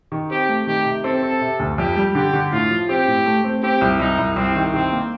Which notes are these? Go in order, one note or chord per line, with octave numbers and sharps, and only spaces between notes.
D#3
C4 G4
A3
D#3 G4
C3
C4 A4
C4
C3
D2
F2 G4
G3
D3 G4
D3
A2 F4
F3
C4 G4
A2
A3
C4
C4 G4
C2
C2 D#4
C2
C2 C4
D#3
D#3 C4
A#3